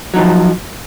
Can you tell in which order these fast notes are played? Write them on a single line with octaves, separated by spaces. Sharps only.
F#3 D#4 F3